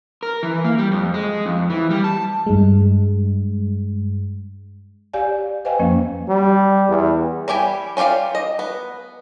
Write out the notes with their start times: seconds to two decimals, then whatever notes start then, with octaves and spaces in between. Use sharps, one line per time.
0.23 A#4
0.43 E3
0.65 A#3
0.78 G3
0.91 F2
1.14 G#3
1.46 F2
1.70 E3
1.90 G3
2.04 A5
2.46 G2 G#3
5.14 G4 C#5 D5 F5 G#5
5.65 B4 C5 D#5 F5 G5 G#5
5.79 F2 F3 A#3 C#4
6.29 G3
6.88 E2
7.48 G3 E4 G4 G#5
7.97 C#4 F4 G4 D5 F5
8.35 D#5
8.59 B3